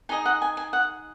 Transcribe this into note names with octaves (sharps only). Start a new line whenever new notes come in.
D#4 G#4 D#5 G#5
F#5
G#5
G#5
F#5